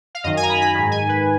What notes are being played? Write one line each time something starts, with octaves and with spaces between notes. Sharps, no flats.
F5
F#2 D#3 D#5
G#5
A#5
B5
B5
G#2 D#3
G#5
B4